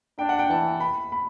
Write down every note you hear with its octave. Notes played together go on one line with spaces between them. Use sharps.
D4 G5
F#5
G5
E3 A5
B5
B5